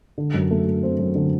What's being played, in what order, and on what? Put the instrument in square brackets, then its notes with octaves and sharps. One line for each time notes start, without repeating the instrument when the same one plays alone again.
[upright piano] D3
F#2
A3
A3
C4
F#2
D3